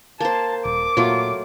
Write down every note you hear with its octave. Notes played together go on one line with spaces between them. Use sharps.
A#3 C5 A5
D#1 D6
A#2 F#3 A3 F4